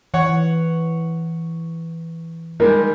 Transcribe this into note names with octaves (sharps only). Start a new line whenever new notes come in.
E3 C#5 F#5
D#3 G3 G#3 A#4